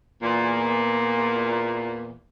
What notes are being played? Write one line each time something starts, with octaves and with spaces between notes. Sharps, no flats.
E2 A#2